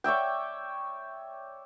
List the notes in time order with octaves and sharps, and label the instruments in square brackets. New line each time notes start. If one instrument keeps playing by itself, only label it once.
[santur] C#5 D5 E5 G5